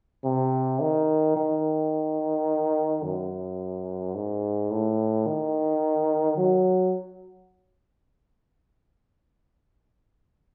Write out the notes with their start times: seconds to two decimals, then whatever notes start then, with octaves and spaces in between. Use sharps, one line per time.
0.24 C3
0.81 D#3
1.37 D#3
3.04 F#2
4.15 G#2
4.71 A2
5.27 D#3
6.37 F#3